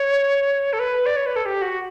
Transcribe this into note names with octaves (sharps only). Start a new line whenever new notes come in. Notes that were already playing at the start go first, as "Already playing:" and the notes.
Already playing: C#5
A4
B4
D5
C#5
B4
A4
G4
F#4